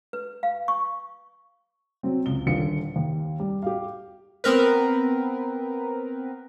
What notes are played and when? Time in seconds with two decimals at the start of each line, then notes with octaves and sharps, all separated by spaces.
0.13 B4
0.43 F5
0.68 C#6
2.03 F#3 C4
2.26 C#2 G7
2.46 D#1 D3 F4 C#7
2.96 D#2
3.40 G3
3.63 G4 F5
4.44 B3 C4 A#4 B4